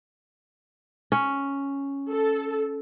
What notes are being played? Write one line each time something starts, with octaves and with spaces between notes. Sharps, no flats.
C#4
A4